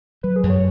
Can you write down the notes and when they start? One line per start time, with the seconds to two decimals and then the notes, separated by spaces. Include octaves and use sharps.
0.23 F#3 B4
0.36 G#4
0.43 F#2
0.50 C#5